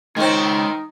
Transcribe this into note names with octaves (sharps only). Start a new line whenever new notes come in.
D#3 G#3 C4 D#4 C#5